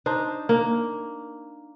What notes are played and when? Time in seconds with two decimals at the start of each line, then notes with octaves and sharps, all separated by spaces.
0.06 D4 D#4 C5
0.49 A#3